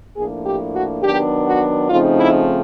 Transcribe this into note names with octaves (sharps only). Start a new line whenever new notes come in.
A2 F3 A#3 D4 G#4
G4
F#4
D#3 F#3 B3 D4 G4
F#4
C#3 F3 A3 C4 D#4 F4
E4